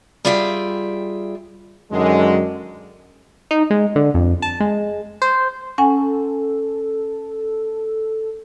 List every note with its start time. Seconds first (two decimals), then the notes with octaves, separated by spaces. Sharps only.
0.25 G3 F4 G#4 E5 F#5 G5
1.92 F#2 D3 D#3 G#3
3.51 D#4
3.70 G#3
3.96 D3
4.14 F2
4.42 A5
4.60 G#3
5.22 C5
5.78 C#4 A4 F#5 G#5